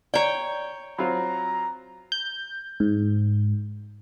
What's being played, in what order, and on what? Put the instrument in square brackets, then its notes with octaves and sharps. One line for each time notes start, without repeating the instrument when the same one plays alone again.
[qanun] C#5 G5 [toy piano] D5 A#5
[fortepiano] F#3 C4 F4 [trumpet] A#5 [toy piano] B5
[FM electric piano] G6
G#2